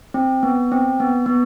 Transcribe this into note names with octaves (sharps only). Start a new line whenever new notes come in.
C4
B3
C4
B3
B3